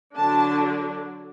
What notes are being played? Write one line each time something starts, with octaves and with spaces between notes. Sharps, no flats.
D3 F#3 D4 A5